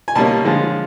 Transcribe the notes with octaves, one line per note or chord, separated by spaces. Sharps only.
G#5
B2 G3 A#3 C#4 A5
D3 F3 G#3